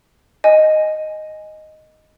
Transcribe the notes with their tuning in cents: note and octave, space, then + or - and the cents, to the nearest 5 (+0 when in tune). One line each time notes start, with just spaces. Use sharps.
D#5 +0 G#5 +0